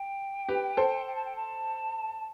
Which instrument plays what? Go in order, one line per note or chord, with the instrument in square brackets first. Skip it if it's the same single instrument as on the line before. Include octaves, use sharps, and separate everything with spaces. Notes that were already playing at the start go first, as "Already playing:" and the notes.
Already playing: [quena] G5
[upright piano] G4 B4
A4 C5
[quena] G5
A5
G5
A5